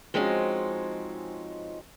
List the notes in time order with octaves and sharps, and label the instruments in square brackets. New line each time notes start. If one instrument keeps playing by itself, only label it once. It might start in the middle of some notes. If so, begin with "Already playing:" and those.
[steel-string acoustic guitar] F3 G#3 C4 C#4 D#4 F#4